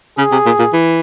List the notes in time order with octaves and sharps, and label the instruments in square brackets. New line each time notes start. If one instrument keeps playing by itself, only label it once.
[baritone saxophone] C#3 [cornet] G#4
[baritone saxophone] C3
A#2
A#2
E3